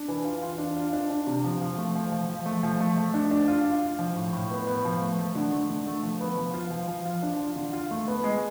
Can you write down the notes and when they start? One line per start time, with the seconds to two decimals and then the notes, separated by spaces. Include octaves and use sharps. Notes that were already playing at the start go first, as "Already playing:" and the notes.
Already playing: D4
0.08 E3
0.25 F4
0.42 F4
0.58 D4
0.76 F4
0.93 D4
1.10 D4
1.27 C3
1.44 F3
1.61 F3
1.78 A3
1.95 F3
2.12 F3
2.30 F3
2.46 A3
2.63 F3
2.80 A3
2.97 A3
3.14 D4
3.31 D4
3.48 F4
3.65 F4
3.82 F4
3.99 F3
4.16 A2
4.33 A2
4.51 B3
4.67 B3
4.85 F3
5.01 A3
5.19 A3
5.35 D3
5.52 A3
5.69 D3
5.87 A3
6.03 F3
6.20 B3
6.37 F3
6.54 F4
6.71 F3
6.88 F3
7.05 F4
7.22 D4
7.39 F4
7.56 D3
7.73 F4
7.91 A3
8.08 B3
8.24 G#3